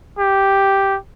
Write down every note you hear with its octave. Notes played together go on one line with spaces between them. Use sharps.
G4